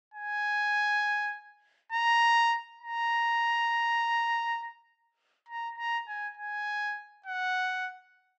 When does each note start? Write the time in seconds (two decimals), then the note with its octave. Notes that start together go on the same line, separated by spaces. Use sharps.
0.14 G#5
1.92 A#5
2.81 A#5
5.48 A#5
5.78 A#5
6.08 G#5
6.37 G#5
7.26 F#5